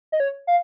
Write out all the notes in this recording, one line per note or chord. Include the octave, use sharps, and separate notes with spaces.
D#5
C#5
F5